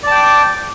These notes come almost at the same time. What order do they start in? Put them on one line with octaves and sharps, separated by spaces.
D5 A5 G5 D6